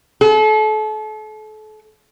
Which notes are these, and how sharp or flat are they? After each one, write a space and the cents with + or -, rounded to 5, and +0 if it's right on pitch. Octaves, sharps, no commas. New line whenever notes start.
A4 -35